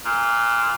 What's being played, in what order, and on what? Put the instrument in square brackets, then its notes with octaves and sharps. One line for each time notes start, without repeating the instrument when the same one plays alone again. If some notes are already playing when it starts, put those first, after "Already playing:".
[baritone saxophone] A#2